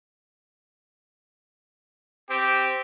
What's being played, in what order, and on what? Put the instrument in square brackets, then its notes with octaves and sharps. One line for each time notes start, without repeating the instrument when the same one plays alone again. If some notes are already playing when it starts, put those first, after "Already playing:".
[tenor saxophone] C4 [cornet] G4